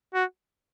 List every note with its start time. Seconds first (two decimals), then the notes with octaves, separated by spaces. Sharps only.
0.14 F#4